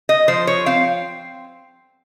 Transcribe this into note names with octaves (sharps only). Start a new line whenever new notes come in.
D#5
F3 C5
C#5
C4 F5